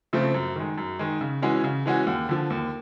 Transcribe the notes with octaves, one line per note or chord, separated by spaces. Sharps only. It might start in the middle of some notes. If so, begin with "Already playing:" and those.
C#3 F3 A3 C4
F#2
D#3 G#3
F#2
D#3 G#3
C#3
E3 G#3 C#4 F#4
C#3
E3 G#3 C#4 F#4
D#2
D3 F3
D#2